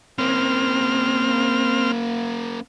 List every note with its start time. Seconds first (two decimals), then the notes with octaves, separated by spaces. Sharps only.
0.18 A#3 C4 C#4 F6